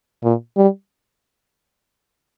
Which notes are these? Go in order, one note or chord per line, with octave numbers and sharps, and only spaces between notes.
A#2
G3